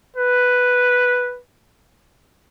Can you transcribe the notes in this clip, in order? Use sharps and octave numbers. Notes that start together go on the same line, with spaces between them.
B4